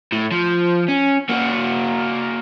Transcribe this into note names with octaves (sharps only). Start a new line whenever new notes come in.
A2
F3
C#4
A#3 F#4